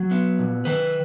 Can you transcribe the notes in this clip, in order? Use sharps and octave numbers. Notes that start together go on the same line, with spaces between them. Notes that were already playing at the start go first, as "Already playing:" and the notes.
Already playing: F#3
B3
A#2
D#3 B4